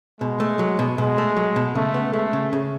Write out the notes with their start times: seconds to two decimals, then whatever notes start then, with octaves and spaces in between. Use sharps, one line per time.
0.21 B2 G#3
0.40 A3
0.59 F#3
0.79 B2
0.98 B2 G#3
1.18 A3
1.37 F#3
1.56 B2
1.75 C#3 A3
1.94 B3
2.13 G#3 A3
2.33 C#3
2.53 C#3